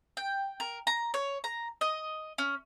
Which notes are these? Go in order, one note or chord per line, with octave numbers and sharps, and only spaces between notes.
G5
A#4
A#5
C#5
A#5
D#5
C#4